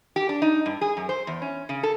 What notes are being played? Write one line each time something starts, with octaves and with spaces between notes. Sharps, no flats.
G4
D4
D#4
G2
G#4
F#2
C5
E2
C#4
C#3
A4